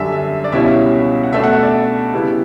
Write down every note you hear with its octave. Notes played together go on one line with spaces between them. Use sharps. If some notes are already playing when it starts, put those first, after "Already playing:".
Already playing: F#2 D3 G3 D4 E5
E5
D5
C#2 B2 G3 C#4 E4 E5
F#5
B2 A3 D4 E5
F#5
E5
D5
C#3 G3 B3 E4